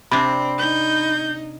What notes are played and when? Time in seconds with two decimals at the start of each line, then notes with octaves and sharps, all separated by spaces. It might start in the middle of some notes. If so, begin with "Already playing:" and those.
0.12 C3 C4 D4 B5
0.58 D#4 G6